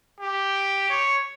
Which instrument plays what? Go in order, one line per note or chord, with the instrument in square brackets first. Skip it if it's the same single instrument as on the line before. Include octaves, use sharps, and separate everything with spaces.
[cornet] G4
C#5